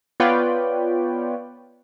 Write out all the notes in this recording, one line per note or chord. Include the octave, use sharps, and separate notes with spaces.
B3 F4 B4 C#5 D5 G5